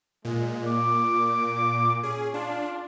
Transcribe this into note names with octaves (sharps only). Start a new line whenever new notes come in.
A#2 G#3
D6
C#4 G#4
D4 F4